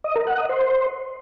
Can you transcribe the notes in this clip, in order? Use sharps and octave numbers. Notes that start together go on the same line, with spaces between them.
D#5
A#4
F#5
D#5
C5